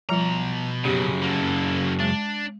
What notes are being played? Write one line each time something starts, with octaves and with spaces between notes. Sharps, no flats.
B2 F3 G3 F4 A#5
F#2 C#3 G4
A#3 A4
G#3 D4